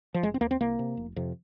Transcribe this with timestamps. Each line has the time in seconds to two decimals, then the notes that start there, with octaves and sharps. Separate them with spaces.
0.14 F3
0.23 F1 G#3
0.34 C4
0.41 D#2 A#3
0.51 C4
0.60 C2 A#3
0.79 C3
0.97 F1
1.16 F2 C3